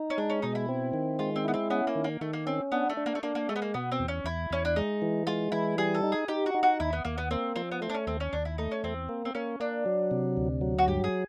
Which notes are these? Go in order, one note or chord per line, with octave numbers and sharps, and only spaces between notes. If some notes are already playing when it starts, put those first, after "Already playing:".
Already playing: D#4
C#4
G#3 D4
C#4
B2 D#4
E4
C4
D#3
G#3 F4
C4
B3 E4
C4
B3 C#4
A#3
D#3
A#3
D#3 A3
A#3
C4 C#4
B3 D4
A3
D4
A#3
A3
A#3 D4
A#3
G#3 A3
B3
A#3
B2 B3
C4
E2
C#4
E2 E4
E2 C#4
D4
G#3 D#4
E3
G#3 F4
E3 E4
G3 G#4
A4
D#4
G#4
D#4 G4
F#4
D#4
F#4
D#2 E4
B3
D#2 A#3
B3
A#3 C4
F3 C4
B3
A3 C4
D4
C#4
D#2 C4
C#4
D#2 D4
E4
A3 D#4
C#4
E2 C4
A#3
C4
A#3 C#4
A#3 D4
F#3
C3
D2
F#3
F#4
G2 G4
G#4